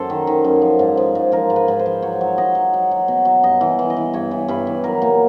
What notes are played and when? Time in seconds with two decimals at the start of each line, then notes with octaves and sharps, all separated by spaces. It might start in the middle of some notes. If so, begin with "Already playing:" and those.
Already playing: F#2 A4 C5
0.10 D#3
0.27 D#3
0.44 F#2
0.62 F3
0.79 G#2
0.97 F3
1.15 G#2
1.32 F3 A#4
1.50 G#2
1.56 B4
1.68 G#2
1.79 C5
1.86 F3
2.02 F#3 C#5
2.21 F#3
2.38 F#3 D#5
2.55 F#3
2.74 F#3
2.91 F#3
3.08 B2
3.25 F#3
3.43 G2 D#5
3.61 E3
3.79 E3
3.90 D#5
3.96 E3
4.13 G2 C#5
4.31 E3
4.48 G2 B4
4.67 E3
4.84 F#3 A#4
5.02 A#2